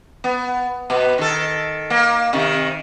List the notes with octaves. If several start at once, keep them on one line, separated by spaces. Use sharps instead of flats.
B3
B2 B3
D#3 A4
A#3
C3 D#3